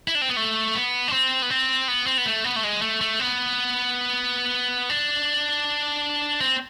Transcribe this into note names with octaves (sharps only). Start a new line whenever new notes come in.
E4
D4
C4
B3
A3
B3
D4
C4
B3
C4
B3
C4
B3
A3
B3
A3
G#3
A3
A3
B3
D4
C4